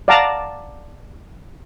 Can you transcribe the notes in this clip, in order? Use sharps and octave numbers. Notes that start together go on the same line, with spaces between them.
D5 F5 F#5 A5 A#5